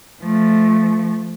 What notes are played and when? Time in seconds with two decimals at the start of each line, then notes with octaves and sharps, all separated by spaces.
0.21 F3 A3